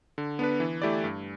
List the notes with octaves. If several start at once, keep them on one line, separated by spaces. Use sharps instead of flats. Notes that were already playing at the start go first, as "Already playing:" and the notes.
D3
B3 D4 B4
E3
A3 E4 G4 D5
G2